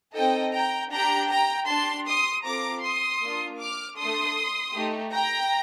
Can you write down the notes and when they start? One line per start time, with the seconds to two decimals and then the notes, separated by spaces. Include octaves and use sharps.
0.15 C4 D#4 A4 D#5 G5
0.54 G5 A#5
0.92 D4 G4 G5 A#5
1.31 G5 A#5
1.68 D4 G4 A5 C6
2.07 C6 D#6
2.46 C4 F4 A4 A#5 D6
2.83 C6 D#6
3.22 A#3 D4 F4
3.61 D6 F6
3.99 A3 D4 A4 C6 D#6
4.76 A3 D#4 G4
5.14 G5 A#5